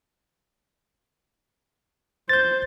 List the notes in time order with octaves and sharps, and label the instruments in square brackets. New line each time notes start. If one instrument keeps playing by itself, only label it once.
[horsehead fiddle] C5 [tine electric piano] G6 A6